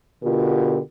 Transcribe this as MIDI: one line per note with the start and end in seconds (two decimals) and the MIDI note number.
0.23 0.79 47
0.23 0.79 50
0.23 0.79 65
0.23 0.79 67
0.23 0.79 70